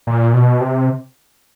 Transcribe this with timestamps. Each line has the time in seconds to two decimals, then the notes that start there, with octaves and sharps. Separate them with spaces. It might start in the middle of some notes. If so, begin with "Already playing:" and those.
0.07 A#2
0.34 B2
0.61 C3